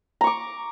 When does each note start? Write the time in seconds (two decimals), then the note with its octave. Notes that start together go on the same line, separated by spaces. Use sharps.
0.21 A#5
0.24 C#6
0.27 D6